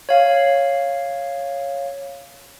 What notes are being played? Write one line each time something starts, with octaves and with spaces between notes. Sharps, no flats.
C#5 F5